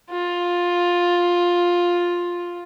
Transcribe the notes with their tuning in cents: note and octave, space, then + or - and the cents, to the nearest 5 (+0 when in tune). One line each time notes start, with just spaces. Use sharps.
F4 +10